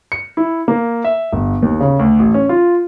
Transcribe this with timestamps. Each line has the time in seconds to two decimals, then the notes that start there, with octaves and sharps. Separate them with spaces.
0.12 C#7
0.37 E4
0.68 A#3
1.04 E5
1.33 G1
1.62 D#2
1.80 C#3
1.99 D2
2.19 A1
2.34 C#4
2.49 F4